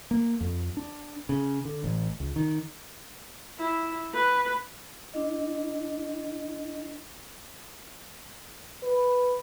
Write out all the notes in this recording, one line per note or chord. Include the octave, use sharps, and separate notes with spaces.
A#3
F2
D4
C#3
D3
A1
C#2
D#3
E4
B4
D4 E4 D#5
B4